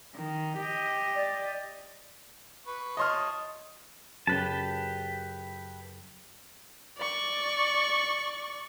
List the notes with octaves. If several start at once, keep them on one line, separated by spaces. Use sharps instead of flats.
D#3
G4 D#5
D5
B4 C#6
C#5 D#5 A5 C6 D#6 F6
F#2 C#3 G4 B4 A5
D5 C#6